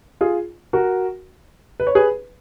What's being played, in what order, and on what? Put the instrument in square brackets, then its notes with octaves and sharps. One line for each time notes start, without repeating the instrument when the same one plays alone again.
[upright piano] F4 G#4
F#4 A#4
B4
C#5
G#4 B4